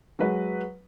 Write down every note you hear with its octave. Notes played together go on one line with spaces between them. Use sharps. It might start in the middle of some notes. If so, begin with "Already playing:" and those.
F#3 G#3 B4